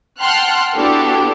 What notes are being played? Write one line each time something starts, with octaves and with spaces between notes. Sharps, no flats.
F#5 G5 A5 C6 F6 F#6
B3 D4 E4 F#4 G4 A4